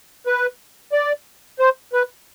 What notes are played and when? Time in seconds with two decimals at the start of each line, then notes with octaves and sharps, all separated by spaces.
0.27 B4
0.93 D5
1.59 C5
1.93 B4